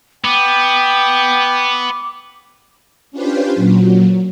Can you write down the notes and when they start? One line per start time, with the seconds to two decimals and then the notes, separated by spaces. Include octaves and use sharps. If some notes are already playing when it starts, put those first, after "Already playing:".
0.25 B3 G5 D6
3.11 C#4 D4 F4 G4 B4 C5
3.55 A#2 F#3